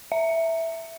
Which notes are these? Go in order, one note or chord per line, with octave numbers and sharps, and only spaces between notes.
E5